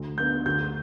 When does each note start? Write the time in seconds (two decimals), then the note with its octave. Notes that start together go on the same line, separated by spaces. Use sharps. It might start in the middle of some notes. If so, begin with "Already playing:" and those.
Already playing: D2
0.18 D3 B3 G6
0.46 D2 G6